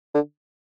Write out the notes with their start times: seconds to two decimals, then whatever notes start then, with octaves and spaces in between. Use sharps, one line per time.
0.14 D3